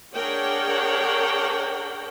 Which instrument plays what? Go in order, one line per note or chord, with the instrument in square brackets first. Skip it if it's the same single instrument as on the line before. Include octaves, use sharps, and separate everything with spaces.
[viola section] D4 G#4 A#4 C#5 F#5 G5